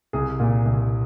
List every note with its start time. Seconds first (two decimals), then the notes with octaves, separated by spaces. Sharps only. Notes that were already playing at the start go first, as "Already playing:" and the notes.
0.13 C2 G#4
0.40 A#2
0.65 C2